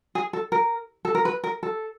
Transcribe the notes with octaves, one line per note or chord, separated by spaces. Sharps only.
G#4
A4
A#4
A4
A#4
B4
A#4
A4